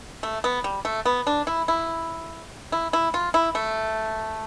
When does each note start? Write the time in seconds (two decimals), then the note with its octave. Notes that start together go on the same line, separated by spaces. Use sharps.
0.23 A3
0.44 B3
0.64 G3
0.85 A3
1.05 B3
1.27 D4
1.47 E4
1.68 E4
2.72 E4
2.93 E4
3.14 F4
3.34 E4
3.55 A3